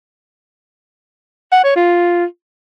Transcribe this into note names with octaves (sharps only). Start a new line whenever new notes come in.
F#5
C#5
F4